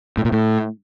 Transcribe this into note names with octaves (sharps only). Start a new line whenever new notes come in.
A2
A#2
A2